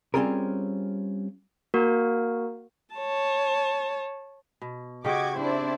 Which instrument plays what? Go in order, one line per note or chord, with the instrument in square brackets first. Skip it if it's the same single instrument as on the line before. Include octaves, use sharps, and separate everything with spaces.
[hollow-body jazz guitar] G3 C4 C#4 F4 G#4 A#4
[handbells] A#3 F#4 A#4
[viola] C#5 A5
[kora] B2
[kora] C#3 G4 [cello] F#4 D#5 [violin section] D6 G#6
[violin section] C4 E4 D5 [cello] D4 C5